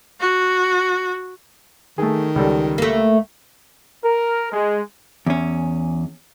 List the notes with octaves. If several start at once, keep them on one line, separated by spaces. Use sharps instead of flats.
F#4
D#3 A3 G#4
C#2 G3 A4
A3 A#3
A#4
G#3
E2 C#4